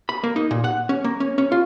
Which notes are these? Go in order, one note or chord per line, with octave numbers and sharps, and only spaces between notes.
B5
A#3
D#4
A#2
F#5
C#4
A#3
C#4
C#4
F4